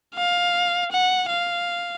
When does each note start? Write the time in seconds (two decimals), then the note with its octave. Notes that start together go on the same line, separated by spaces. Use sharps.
0.15 F5
0.92 F#5
1.30 F5